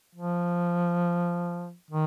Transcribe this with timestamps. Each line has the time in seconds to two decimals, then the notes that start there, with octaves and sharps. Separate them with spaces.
0.15 F3
1.91 D#3